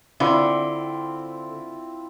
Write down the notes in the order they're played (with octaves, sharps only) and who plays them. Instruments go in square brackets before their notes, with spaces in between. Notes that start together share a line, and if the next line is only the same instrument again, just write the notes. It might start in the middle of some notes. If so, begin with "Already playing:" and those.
[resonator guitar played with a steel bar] D3 [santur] C4 E4 F4